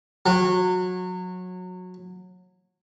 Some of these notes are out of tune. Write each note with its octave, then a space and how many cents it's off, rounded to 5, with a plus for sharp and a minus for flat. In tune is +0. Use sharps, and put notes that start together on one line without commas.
F#3 -20